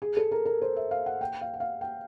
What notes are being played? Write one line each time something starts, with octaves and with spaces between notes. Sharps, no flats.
G#4
A4
A#4
A#4
C5
E5
F5
F#5
G5
F5
F#5
F5
G5